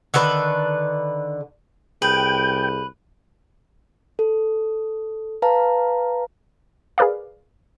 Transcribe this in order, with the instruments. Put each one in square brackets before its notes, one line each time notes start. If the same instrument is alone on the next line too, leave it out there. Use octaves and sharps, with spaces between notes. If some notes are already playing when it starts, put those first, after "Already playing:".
[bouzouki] D3 D#3 A4 B4
[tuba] C2 [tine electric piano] G#4 G6 [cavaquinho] B4 [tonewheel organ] G5
[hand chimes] A4
B4 F5 A5 A#5
[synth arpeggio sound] G#4 A#4 B4 D5 F5